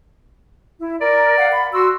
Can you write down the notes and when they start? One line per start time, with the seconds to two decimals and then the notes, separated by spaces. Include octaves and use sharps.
0.80 E4
1.01 A#4 D5
1.39 F5 F#5
1.52 B5
1.73 F#4 C6 E6